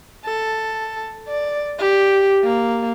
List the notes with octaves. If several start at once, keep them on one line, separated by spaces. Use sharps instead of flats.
A4
D5
G4
A#3